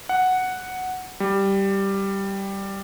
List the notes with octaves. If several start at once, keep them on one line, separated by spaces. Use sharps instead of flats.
F#5
G3